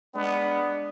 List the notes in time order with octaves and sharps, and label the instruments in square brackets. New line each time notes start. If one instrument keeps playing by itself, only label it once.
[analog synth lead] G#3 [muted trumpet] B3 [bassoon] D4